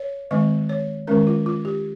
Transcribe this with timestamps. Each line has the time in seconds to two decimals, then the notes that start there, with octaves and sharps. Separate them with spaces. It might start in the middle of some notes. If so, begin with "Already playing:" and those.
Already playing: C#5
0.31 D#3 G#3 C4 D#5
0.69 C#5
1.07 D#3 G#3 C#4 A#4
1.27 F4
1.46 F4
1.65 G4